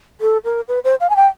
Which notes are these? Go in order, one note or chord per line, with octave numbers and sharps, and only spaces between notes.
A4
A#4
B4
C5
F5
G#5
G5